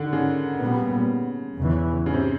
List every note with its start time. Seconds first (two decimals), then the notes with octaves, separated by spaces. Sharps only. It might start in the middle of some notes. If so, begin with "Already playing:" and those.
Already playing: D3 D#3
0.13 C#3
0.60 A#2 G3 B3
1.58 E2 C#3 E3
2.06 C#3
2.14 C3